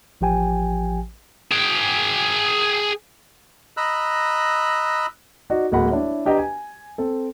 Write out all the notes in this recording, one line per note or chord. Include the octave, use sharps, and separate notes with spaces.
A1 F3 G4 G5 G#5
G#4 G5
D#5 A#5 B5 E6 F#6
D#4 F#4 D5 D#5
D1 G#3 A#3 F#4 F#5 B5
D4 E4 C#5
D4 G4 B4 D#5 G5 A#5
G#5
C4 A4